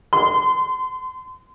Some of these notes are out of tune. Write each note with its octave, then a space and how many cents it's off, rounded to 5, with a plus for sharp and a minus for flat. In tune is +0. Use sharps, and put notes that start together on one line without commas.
C6 -30